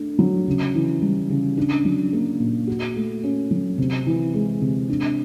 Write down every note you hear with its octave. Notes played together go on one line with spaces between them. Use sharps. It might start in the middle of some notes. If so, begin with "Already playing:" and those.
Already playing: A3 D4
F#3
C#3
E3
G3
C#3
D4
F#3
A#3
A#2
F#4
A3
C#4
F#3
C3
E3
G#3
C3
D4